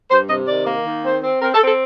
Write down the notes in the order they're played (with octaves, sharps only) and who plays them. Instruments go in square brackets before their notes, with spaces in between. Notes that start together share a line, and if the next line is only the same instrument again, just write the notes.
[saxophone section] G2 C5
C3 D#5
D#3 D5
A#3
D#3
C4 C5
C4
C4 A#4
A4
C4
A4